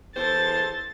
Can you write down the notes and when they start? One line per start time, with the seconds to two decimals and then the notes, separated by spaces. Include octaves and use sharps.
0.16 E2 A4 C5 A6